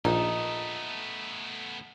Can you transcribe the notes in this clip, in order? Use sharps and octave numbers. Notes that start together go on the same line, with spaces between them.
A#1 A3 B3 D#4